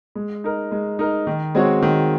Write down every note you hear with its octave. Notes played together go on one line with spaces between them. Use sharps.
G#3
D#4 A#4
G#3
D#4 A#4
D#3
G#3 C4 F#4 C#5
D#3